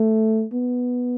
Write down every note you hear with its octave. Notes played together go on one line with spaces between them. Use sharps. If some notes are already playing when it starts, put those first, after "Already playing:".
Already playing: A3
B3